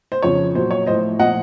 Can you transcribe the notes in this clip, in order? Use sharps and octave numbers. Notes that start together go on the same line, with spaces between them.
C5
F2 C#3 F3 C#5
A#2 F#3 C5
C#5
A2 F3 C5 D#5
A#2 F3 D#5 F#5